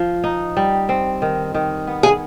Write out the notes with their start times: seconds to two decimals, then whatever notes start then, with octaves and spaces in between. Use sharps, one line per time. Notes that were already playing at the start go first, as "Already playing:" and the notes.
Already playing: F3
0.24 D#4
0.57 G3
0.89 C4
1.22 D#3
1.54 D#3
1.87 B3
2.03 G#4